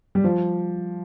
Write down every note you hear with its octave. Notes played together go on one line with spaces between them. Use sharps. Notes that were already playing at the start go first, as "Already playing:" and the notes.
G3
F3